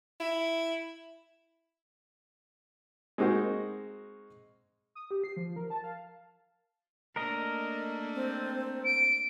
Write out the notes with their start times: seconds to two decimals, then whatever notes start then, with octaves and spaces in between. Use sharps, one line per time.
0.21 E4
3.18 G#3 C4 D#4 F#4 A#4
4.95 D#6
5.11 G4
5.24 C7
5.37 F3
5.56 A#4
5.70 A5
5.84 F5
7.16 A3 A#3 D4 A#4 D#5
8.15 C4
8.85 D7